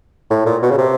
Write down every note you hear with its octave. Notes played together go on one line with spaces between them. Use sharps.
A2
A#2
B2
C#3
C3